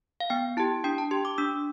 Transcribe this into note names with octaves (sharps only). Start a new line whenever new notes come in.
F5
B3 G5
E4 G4 A5
D4 G5
A5
G4 C6
D6
D4 E6